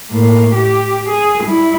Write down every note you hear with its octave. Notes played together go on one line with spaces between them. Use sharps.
A2 A#3
G4
G#4
G3 E4